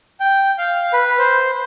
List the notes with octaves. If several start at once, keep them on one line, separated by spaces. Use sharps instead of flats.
G5
F5
B4
C5